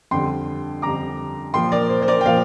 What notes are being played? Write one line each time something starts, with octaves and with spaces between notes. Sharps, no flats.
F2 D3 G3 G5 C6
F2 D3 G3 A#5 D6
A#2 F3 G5 C6
A#4 D5
C5
C5
A#4 D5
G5
A#2 F3 C5 F5